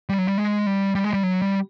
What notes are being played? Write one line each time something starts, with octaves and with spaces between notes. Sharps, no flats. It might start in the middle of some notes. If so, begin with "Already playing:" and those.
G3
F#3
G3
G#3
G3
G3
G#3
G3
F#3
G3